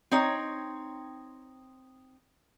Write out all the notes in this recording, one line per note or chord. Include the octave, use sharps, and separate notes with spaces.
C4 D#4 C#5